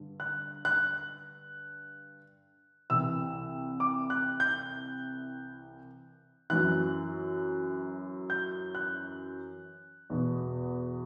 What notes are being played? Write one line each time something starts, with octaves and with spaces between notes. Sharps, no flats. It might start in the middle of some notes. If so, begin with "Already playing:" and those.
Already playing: G2 D3
F#6
F#6
C2 C3 E3 E6
D6
F#6
G6
F#2 E3 F#6
G6
F#6
E2 B2